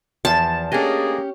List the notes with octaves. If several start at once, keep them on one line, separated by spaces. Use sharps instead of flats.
E2 F3 A5
A3 A#3 C#4 D4 G4 G#4 D#5